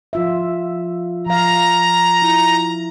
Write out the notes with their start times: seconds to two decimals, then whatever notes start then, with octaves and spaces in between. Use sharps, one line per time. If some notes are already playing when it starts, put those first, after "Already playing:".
0.13 F3 F4 E5
1.26 F3 F5 A#5
2.22 E4